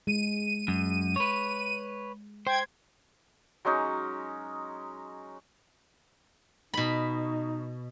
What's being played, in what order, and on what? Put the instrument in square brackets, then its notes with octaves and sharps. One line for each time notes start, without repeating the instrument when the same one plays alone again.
[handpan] G#3 [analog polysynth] D#7
[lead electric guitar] F#2
B4 C#5
[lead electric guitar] C5 [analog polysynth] G5 G#6
[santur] F#3 G#3 C#4 D#4
[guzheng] B2 B5 [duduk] D#4